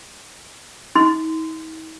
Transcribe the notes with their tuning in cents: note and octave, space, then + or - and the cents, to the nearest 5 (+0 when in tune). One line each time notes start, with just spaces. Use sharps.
D#4 +45 C6 -25